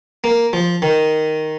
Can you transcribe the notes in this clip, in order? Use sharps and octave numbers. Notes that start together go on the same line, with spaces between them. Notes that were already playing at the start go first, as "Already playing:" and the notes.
A#3
F3
D#3